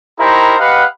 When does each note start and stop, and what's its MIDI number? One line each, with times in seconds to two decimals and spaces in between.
0.19 0.56 63
0.19 0.56 64
0.19 0.56 67
0.19 0.56 70
0.19 0.56 72
0.19 0.56 82
0.58 0.84 67
0.58 0.84 71
0.58 0.84 75
0.58 0.84 77
0.58 0.84 78